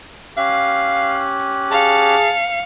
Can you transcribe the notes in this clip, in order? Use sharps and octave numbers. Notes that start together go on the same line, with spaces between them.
C#4 G4 F5 F#6
G#4 F5 A5 C#7